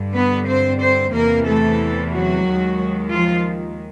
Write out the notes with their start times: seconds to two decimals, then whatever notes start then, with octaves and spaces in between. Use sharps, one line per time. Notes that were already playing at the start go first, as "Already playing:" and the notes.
Already playing: G2 D3 G3
0.15 B3 B4
0.47 C4 C5
0.81 C4 C5
1.14 E2 C3 E3 A#3 A#4
1.47 A3 A4
2.12 F#3 F#4
2.46 D#2 D#3 G#3
3.12 F3 F4